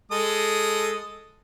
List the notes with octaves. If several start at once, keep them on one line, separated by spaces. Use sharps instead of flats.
G#3 A4 D#6